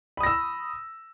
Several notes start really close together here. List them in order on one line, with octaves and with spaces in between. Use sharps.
B5 D#6 A#6 E6